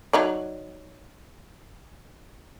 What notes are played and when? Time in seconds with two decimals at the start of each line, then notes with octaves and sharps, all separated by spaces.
0.13 F#3 D#4 D5